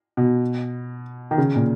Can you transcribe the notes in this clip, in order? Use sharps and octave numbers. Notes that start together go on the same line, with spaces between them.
B2
D#3
C#3
A#2